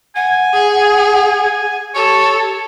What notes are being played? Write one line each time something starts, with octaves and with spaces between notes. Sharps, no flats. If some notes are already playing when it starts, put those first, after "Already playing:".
F#5 G#5
G#4
G#5
G4 A4 C#5